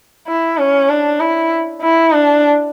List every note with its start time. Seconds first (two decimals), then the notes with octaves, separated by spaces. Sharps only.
0.28 E4
0.58 C#4
0.89 D4
1.20 E4
1.82 E4
2.12 D4